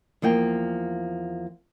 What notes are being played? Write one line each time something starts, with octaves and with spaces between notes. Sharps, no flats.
E2 F3 A#3 G5